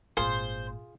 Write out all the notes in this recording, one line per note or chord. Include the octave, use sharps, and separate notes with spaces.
G#1 A#2 F4 G#4 C5